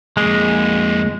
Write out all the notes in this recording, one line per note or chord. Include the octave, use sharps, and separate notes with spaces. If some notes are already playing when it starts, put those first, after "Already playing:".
F2 G#3 A#3 G#4